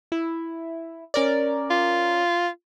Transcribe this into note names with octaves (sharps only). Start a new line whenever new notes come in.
E4
C#4 A#4 D5
F4